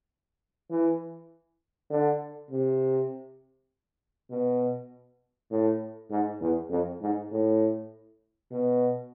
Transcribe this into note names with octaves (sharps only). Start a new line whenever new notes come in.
E3
D3
C3
B2
A2
G#2
E2
F2
G#2
A2
B2